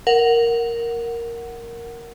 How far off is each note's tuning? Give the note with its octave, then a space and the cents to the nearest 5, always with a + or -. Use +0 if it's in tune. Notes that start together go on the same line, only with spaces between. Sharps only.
A#4 +0 F#5 +0